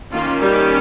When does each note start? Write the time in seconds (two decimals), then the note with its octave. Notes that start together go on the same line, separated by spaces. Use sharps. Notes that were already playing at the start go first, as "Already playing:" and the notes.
0.12 D#3 A#3 C#4 F4
0.42 G3 G4